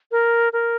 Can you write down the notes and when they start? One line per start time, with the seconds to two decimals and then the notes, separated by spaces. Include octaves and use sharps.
0.12 A#4
0.53 A#4